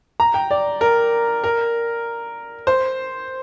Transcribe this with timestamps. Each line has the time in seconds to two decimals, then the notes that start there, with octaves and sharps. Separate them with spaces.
0.20 A#5
0.34 G5
0.51 D5
0.81 A#4
1.44 A#4
2.67 C5